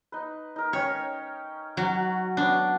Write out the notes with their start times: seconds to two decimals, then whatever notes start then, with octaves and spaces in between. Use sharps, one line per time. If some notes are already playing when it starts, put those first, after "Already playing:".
0.12 D#4 B4
0.56 D#4 A#4
0.73 C#4 C#5 G5
1.77 F#3 F#4
2.37 B3 D4 F#4 C#5